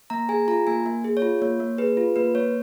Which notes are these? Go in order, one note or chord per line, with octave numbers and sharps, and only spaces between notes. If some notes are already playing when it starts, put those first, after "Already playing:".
A#3 A#5
G#4 G#5
F4 A#5
A#3 G#5
A#3
G#4
C#5
F4
A#3 C#5
A#3
G#4 B4
F4
A#3 B4
A#3 C#5